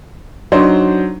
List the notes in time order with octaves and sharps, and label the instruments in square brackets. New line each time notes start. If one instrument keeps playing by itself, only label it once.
[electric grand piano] F#3 [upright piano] D4 D#4 C5